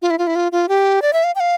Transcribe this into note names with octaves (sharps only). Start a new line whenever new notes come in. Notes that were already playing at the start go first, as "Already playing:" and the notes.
F4
E4
F4
E4
F4
F4
G4
D5
E5
F5
G5
F5